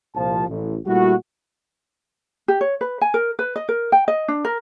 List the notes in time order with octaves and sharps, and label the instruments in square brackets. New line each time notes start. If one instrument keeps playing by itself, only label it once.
[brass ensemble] C2 A#2 F3 A5
A1
A#2 G3 A3 E4 F#4
[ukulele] G4
C#5
B4
G#5
A#4
B4
D#5
A#4
G5
D#5
D4
A#4